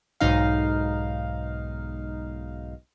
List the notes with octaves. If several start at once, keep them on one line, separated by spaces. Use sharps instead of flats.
B1 G#2 D#4 F5